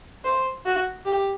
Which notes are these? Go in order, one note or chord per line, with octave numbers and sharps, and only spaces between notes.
C5
F#4
G4